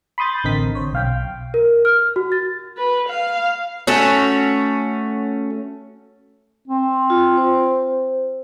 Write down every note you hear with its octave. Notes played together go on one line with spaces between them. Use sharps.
B5 C6 D#6 G6 A6
A1 D3 C4 A#4 D#5 B6
C5 C#5
B1 F5 G5
A#4
F6
F#4
A6
B4
F5
A3 C#4 F#4
C4
F4
C5